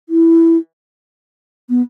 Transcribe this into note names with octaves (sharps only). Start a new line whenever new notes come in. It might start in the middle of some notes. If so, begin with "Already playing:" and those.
E4
B3